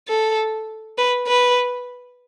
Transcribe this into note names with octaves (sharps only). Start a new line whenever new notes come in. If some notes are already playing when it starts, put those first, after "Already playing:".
A4
B4
B4